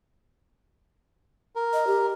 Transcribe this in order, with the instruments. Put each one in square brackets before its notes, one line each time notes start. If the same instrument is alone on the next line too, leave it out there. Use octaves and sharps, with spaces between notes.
[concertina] A#4
[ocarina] D#5
G4